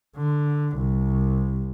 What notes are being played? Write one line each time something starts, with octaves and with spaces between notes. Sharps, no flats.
D3
C2